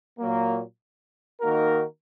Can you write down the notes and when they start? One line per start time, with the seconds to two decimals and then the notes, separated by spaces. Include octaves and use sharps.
0.19 A#2 F#3 A#3
1.41 D#3 A#3 D#4 F#4 A#4